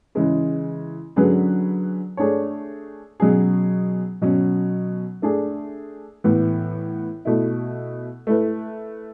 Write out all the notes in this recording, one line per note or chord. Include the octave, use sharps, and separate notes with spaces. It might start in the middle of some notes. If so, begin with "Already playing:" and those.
C#3 E3 G#3 C#4
D3 F#3 C#4 G#4 B4
A3 D4 G#4 C#5
B2 F#3 C#4 G#4
B2 F#3 C#4
A3 D4 G#4
A2 E3 B3
B2 A3 E4
A3 E4 B4